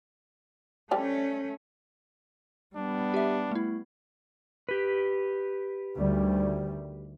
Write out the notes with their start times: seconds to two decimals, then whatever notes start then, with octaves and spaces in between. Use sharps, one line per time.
0.91 F3 G3 A3 C#4 D4
2.76 G3 B3 D4
3.14 G4 E5
3.51 A3 E4
4.69 G4 B4
5.95 D2 D#3 G3